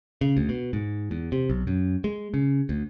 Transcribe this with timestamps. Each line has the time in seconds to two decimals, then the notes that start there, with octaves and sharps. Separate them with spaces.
0.21 C#3
0.37 D2
0.49 B2
0.73 G#2
1.11 E2
1.32 C3
1.50 B1
1.67 F#2
2.04 G#3
2.34 C#3
2.69 D2